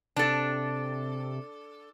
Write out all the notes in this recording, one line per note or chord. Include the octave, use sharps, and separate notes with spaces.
C3 D4 A4